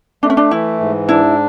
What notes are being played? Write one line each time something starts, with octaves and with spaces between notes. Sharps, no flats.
A3 D4
C#4
D4
E3 E4
G#2
D4 E4